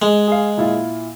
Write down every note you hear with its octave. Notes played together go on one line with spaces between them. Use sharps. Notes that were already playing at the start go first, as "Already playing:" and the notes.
G#3
G#4 F5
A#2 E4 F4